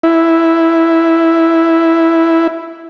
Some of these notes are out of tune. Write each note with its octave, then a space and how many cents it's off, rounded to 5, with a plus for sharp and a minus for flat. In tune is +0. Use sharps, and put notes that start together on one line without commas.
E4 +0